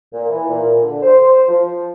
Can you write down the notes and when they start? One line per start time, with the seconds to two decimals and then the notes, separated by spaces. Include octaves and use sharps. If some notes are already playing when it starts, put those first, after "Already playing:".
0.13 A#2
0.28 E3
0.48 A#2
0.82 D3
1.02 C5
1.48 F3